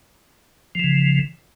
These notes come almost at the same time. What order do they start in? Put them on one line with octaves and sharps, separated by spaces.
F3 E3 C#3